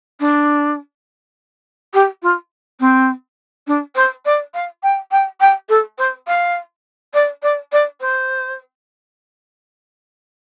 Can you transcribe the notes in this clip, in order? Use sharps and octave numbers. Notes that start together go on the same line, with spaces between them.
D4
G4
F4
C4
D4
C5
D5
F5
G5
G5
G5
A4
C5
F5
D5
D5
D5
C5